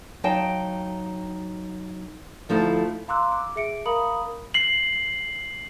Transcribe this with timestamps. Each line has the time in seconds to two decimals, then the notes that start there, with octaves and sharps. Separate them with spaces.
0.24 F#3 D#4 F5 G5 A5
2.49 D2 F3 A3 D#4 E4
3.08 F5 A#5 C6 D6 E6 F#6
3.32 D6
3.56 G#4 E5 C#7 D7
3.85 A#4 F5 A#5 B5 D#6 F#7
4.54 C7 F#7